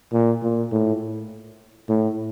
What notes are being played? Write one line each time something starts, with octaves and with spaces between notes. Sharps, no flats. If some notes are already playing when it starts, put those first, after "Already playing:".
A#2
A#2
A2
A2